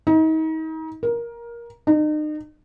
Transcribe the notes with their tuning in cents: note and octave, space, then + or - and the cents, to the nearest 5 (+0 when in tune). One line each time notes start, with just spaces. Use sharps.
D#4 +35
A#4 +15
D#4 -35